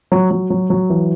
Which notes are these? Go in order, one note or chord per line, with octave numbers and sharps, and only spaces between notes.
F#3
F#3
F#3
F#3
E3